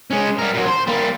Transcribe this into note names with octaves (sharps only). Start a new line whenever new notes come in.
G#3 C#4
G3 A#4
A#2 F#3
C5
G3 A#3